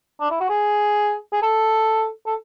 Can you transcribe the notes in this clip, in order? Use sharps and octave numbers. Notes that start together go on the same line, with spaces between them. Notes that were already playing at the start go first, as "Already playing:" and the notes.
D4
E4
F#4
G#4
G#4
A4
A4